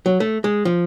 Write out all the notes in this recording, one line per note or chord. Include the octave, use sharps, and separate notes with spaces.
F#3
A3
G#3
F3